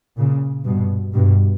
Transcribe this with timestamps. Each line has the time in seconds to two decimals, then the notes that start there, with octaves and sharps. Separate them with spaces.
0.17 A#2 C#3
0.65 G2 B2
1.13 G2 B2